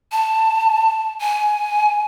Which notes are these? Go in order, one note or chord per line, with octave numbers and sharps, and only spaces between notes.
A5
G#5